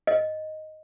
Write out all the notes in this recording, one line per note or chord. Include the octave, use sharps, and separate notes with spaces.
D#5